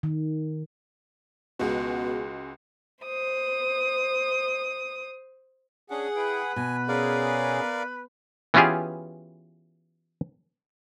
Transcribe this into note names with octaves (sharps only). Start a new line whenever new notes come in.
D#3
C#2 B2 G#3 F#4
C5 D#6
C#4 D4 G#4 F#5
E4 B4 G5
B2 G#5
C#4 G#4 A#4 D5 F5
E3 B3 C#4 F4 G4 G#4